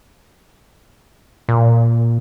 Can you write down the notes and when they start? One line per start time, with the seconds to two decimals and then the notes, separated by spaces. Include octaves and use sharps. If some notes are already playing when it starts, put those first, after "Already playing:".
1.49 A#2